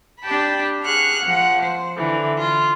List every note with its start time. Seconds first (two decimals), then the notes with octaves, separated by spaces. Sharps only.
0.22 D4 G4 G5 A5 B5
0.84 G#4 F#5 C#6 F6 F#6
1.21 F3 F#5
1.61 C5
1.97 D3 E3
2.40 F4